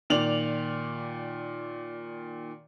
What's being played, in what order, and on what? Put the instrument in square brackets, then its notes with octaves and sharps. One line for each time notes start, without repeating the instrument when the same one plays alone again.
[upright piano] A#2 D#3 D5 F7 F#7